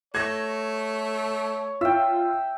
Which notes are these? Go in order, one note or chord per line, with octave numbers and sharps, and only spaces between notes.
A3 C#5 G#6 A#6
F4 E5 G5